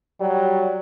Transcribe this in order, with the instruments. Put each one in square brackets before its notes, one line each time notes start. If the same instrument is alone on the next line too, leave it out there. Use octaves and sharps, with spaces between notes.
[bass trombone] F#3 [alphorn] G3